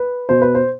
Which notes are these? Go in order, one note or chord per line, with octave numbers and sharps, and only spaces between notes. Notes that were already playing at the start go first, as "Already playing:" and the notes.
Already playing: B4
B2 C5
B4
C5